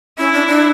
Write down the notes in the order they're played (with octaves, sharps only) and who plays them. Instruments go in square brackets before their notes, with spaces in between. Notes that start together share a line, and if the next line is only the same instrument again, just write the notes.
[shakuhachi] C#4 [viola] E4
[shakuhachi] D4
D4